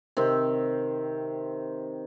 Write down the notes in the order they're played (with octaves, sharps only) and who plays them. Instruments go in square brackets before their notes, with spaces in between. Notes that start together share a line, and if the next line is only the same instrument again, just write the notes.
[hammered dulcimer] C3 D#3 C4